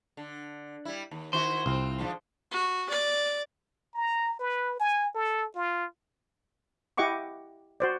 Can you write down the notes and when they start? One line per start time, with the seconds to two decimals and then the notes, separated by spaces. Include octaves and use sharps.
0.17 D3
0.85 G3 E4
1.11 D#2
1.33 D#3 E4 F#4 C5
1.66 C2 C4 F4
1.98 G#2 D3 F3
2.51 F#4
2.89 D5
3.94 A#5
4.39 B4
4.80 G#5
5.15 A4
5.55 F4
6.97 E4 G4 D#5 F#5 C#6 D6
7.80 F#4 C5 D5